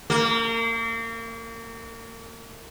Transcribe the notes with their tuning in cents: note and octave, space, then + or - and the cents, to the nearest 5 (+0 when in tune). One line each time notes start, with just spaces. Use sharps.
A#3 -35